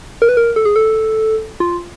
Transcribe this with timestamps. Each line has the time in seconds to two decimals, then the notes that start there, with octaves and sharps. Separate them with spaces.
0.22 A#4
0.29 B4
0.37 A#4
0.56 A4
0.65 G#4
0.76 A4
1.60 F4